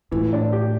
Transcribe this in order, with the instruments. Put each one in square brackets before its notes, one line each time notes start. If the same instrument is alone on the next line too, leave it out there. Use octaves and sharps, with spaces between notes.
[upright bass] A2 [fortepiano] E3
[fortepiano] D4
G4